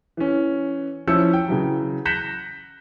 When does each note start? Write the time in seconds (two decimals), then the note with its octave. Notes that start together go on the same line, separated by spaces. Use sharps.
0.17 E3 C#4
1.07 F3 C#4 E4 E6 G6 C#7
1.33 G5
1.48 C#3 E3 F#3
2.05 F#6 G6 A#6 B6 C#7 E7